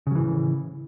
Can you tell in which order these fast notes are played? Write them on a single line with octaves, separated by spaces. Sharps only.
C#3 F#3 E3 A2